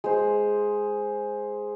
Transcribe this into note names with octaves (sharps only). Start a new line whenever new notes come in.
G#3 C5